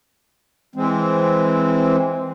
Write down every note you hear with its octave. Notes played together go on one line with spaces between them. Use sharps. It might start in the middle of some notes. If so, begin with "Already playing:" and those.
E3 G#3 C4